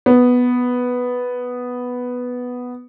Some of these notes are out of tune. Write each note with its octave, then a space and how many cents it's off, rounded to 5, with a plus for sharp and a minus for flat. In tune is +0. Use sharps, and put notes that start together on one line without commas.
B3 +0